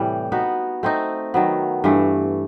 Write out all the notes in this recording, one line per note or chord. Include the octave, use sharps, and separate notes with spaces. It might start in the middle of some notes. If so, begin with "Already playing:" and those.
Already playing: A2 C3 E3 G3
B3 D#4 F#4 B4
A3 C4 D#4
D#3 F#3 B3
G2 E3 A3